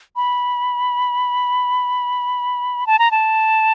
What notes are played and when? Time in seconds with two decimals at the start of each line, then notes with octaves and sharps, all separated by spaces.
0.16 B5
2.87 A5
2.99 A#5
3.11 A5